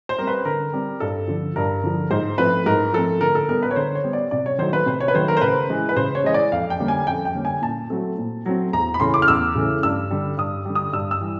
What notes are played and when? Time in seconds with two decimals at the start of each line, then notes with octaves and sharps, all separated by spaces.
0.09 C5
0.18 G3 C4 A#4
0.27 B4
0.45 D3 A#4
0.73 G3 C4
1.00 G2 A4
1.28 D3 F3
1.56 G2 A#4
1.84 D3 F3
2.11 G#2 C5
2.38 F3 A3 C4 B4
2.66 G#2 A#4
2.93 F3 A3 C4 A4
3.21 D3 A#4
3.35 A4
3.49 G3 B3 A#4
3.62 B4
3.71 C#5
3.76 D3 C5
3.95 C#5
4.04 G3 B3
4.13 D5
4.31 C3 D5
4.46 C#5
4.59 D#3 F#3 A3 C5
4.73 B4
4.86 C3 C5
5.00 C#5
5.08 B4
5.14 D#3 F#3 A3 C5
5.28 A#4
5.37 C5
5.41 C#3 B4
5.70 E3 G#3
5.89 B4
5.96 C#3 C5
6.15 C#5
6.24 E3 G#3 D#5
6.34 D5
6.52 F2 F5
6.70 G5
6.80 D3 G3 A#3 C#4
6.88 G#5
7.07 F2 G5
7.25 G5
7.35 D3 G3 A#3 C#4
7.45 G#5
7.62 A#2 A5
7.90 F#3 A3 C4
8.18 A#2
8.46 F#3 A3 C4
8.73 E2 A#5
8.94 B5
9.00 C#3 E3 A3 C#4 C6
9.14 D6
9.22 F6
9.28 E2 E6
9.55 C#3 E3 A3 C#4
9.83 G2 E6
10.10 D3 G3
10.38 G2 D#6
10.65 D3 G3
10.75 D#6
10.93 G2 E6
11.11 E6
11.21 E3 G3